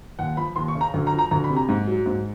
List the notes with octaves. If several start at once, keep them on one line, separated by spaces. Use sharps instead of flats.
D#2 F#5
F3 B5
D#2 C6
C#6
C#3
A#5
D2
A#5
F3
A#5
D2 A#5
B5
C3
A#5
G#2
F#3
G#2